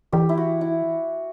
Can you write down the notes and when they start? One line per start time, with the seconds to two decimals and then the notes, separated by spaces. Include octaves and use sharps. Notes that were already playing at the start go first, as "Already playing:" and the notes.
0.12 E3 G4
0.29 E4
0.38 F#4
0.61 E4